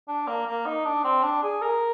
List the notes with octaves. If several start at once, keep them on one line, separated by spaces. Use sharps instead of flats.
D4
A#3
A#3
D#4
D4
C4
D4
G#4
A#4